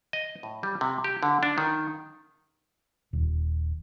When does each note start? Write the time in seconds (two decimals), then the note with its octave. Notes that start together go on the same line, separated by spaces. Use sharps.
0.13 D#5
0.43 A2
0.63 G3
0.81 C3
1.04 G4
1.23 D3
1.43 D4
1.58 D#3
3.13 D#1